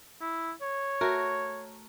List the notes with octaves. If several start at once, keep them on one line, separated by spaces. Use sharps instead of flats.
E4
C#5
A3 F#4 A#4